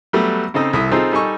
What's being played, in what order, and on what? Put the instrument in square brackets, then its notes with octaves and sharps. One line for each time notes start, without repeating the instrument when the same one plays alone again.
[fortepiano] F#3 G3 A3 B3
C#3 C4 D#4 A4 D#5
C2 E4 A4 E5 D#6
C4 D#4 F4 G#4 A4 C5
G3 D#4 A4 G#5 C#6